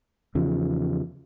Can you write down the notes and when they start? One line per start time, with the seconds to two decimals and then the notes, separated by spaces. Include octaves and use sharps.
0.35 E2 C#3 F3